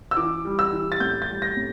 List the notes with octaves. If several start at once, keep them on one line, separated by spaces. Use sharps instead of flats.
E6
E3 D6
G3
E6
E3
A6
A2 G6
A6
G3
A#6
A2